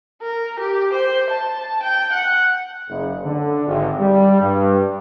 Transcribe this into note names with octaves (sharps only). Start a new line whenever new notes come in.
A#4
G4
C5
A5
G5
F#5
F#1
D3
G#1
G3
G2